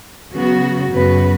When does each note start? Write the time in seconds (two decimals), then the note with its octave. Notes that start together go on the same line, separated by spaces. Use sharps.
0.33 C#3 F#3 B3 F#4
0.93 F#2 C#3 B3 F#4 B4